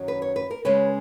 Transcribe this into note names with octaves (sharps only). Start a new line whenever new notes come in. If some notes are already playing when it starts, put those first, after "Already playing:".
Already playing: F#2 D#3 F#3 C#4
B4
C#5
B4
A#4
C#3 G#3 C#4 B4